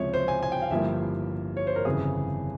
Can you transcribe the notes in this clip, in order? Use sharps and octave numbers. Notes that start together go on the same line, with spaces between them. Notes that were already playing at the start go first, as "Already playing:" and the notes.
Already playing: C#2 C3 F3 G#3 C#5 E5
C5
G#5
G#5
G5
F5
G1 G2 F3 A#3 E4 E5
C#5
C5
A#4
G1 F2 C#3 E3 G#4